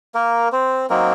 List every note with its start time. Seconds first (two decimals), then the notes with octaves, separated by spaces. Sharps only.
0.15 A#3 A#4
0.52 C4 C5
0.90 F#3 A#3 C4 D#4 A#4